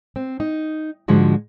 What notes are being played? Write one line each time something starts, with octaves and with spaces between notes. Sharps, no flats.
C4
D#4
G#2 D3 F3 G#3 F#4